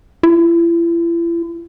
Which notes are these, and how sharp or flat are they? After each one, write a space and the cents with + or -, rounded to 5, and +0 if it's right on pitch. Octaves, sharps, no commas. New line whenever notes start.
E4 +40